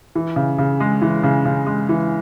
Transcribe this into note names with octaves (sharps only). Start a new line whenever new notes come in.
E3
C#3
C#3
G#3
E3
C#3
C#3
G#3
E3